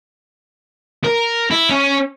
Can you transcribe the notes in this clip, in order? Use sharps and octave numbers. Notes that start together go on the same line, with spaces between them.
A#4
E4
C#4